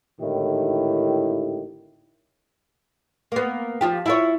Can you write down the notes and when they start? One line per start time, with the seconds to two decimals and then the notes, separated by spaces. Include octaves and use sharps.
0.20 G#1 A2 D3 D#3 E4 G4
3.32 A#3 B3
3.81 F3 F4 G4
4.06 E4 F4 C#5